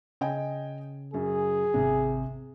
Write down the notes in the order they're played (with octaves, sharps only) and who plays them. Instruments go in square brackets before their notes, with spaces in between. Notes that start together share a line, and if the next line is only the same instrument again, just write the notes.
[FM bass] C#3 [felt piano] D#5 G5 G#5
[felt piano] F#2 [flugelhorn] G#4
[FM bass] G#1 [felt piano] C3